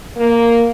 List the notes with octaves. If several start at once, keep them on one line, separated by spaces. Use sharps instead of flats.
A#3